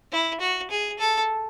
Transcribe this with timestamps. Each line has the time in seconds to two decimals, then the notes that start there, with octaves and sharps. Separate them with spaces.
0.12 E4
0.40 F#4
0.70 G#4
0.99 A4